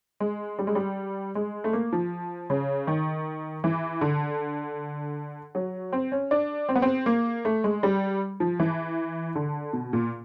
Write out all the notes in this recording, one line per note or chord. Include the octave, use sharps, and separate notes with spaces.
G#3
G3
G#3
G3
G#3
A3
A#3
F3
C#3
D#3
E3
D3
F#3
C4
C#4
D4
C4
B3
C4
A#3
A3
G#3
G3
F3
E3
D3
B2
A#2